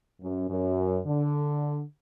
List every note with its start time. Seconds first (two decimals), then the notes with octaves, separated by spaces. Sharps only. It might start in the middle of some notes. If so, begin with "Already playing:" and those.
0.20 F#2
0.48 F#2
1.05 D3